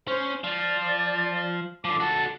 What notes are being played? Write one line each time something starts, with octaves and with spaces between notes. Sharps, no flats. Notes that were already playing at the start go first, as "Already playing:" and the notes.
C#4 C5
F3 F4 D5
D3 F3 D6
F#4 A4 A5